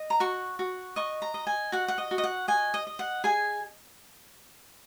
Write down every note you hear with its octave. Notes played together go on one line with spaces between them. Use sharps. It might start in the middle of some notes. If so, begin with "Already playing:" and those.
Already playing: D#5
A#5
F#4 C#6
F#4
D#5 C#6
A#5
D#5
G#5
F#4 F#5
F#5
D#5
F#4
D#5
F#5
D#5 G#5
D#5
D#5
F#5
G#4 G#5